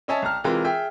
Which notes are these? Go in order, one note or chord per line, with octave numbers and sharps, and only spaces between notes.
C#4 C#5 D#5 E5 G#5 A5
C2 A5 A#5 F6
C3 E3 G#3 F4 A#4
G#4 E5 G5